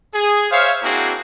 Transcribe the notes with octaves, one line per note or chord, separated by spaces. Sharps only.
G#4
C5 C#5 E5 F5
A#3 C4 D4 E4 F#4 G#4